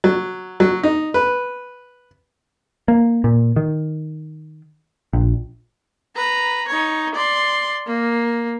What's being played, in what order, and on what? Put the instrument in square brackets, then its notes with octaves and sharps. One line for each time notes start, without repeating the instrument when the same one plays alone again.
[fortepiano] F#3
F#3
D#4
B4
[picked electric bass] A#3
A#2
D#3
A#1
[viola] B4 A#5
D#4 C#5
D5 C6
A#3